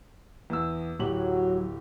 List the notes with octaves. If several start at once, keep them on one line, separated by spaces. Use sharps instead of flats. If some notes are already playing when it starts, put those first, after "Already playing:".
E2 E6
D1 F#3 G4 F#7